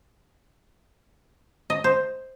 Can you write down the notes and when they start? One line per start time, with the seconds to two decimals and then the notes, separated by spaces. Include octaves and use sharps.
1.70 D#5
1.84 C5